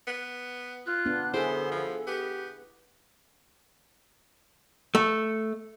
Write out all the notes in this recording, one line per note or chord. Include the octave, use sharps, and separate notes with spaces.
B3
F4 F#6
B3 D4
F#2 D3 B3 E4 G#4 A4 C5
F3
B3 G4
A3